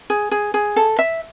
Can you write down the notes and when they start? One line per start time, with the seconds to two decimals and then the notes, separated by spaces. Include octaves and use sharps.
0.10 G#4
0.31 G#4
0.54 G#4
0.76 A4
0.99 E5